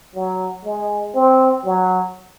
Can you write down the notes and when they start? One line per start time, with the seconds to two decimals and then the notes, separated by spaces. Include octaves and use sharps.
0.15 F#3
0.65 G#3
1.15 C4
1.65 F#3